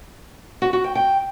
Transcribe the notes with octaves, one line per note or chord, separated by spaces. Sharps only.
F#4
F#4
G5
G5